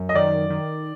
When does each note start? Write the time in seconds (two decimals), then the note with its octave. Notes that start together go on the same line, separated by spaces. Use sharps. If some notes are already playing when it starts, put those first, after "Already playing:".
Already playing: F#2
0.09 D#5
0.14 D#3 D5
0.50 D#3